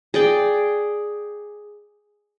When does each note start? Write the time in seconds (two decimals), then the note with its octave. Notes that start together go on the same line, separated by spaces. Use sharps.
0.14 G#4 D5 G5